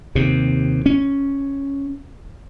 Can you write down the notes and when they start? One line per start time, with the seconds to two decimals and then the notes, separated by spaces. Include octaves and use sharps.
0.15 D#2 C3
0.86 C#4